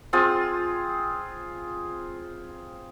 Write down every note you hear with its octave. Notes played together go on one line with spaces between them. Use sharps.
C4 F4 G#4 C5